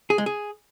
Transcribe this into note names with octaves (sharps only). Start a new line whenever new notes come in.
G#4
G#3
G#4